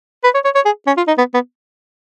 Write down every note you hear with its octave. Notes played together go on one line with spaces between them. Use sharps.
B4
C#5
C#5
C#5
G#4
C#4
F4
D#4
B3
B3